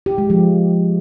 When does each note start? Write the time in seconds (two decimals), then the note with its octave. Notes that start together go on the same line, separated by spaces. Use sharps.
0.06 G4
0.18 G#3
0.30 F3